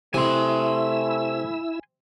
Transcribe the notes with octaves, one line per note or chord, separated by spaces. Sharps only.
C3 A3 E4 G#5 C6 E6